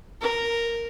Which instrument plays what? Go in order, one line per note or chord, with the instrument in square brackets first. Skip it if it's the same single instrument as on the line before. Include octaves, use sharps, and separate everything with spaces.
[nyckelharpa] A#4